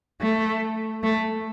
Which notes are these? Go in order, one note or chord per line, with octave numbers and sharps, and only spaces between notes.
A3
A3